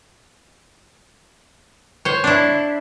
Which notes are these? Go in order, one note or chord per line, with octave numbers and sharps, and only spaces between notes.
C5 C#5
D4 E4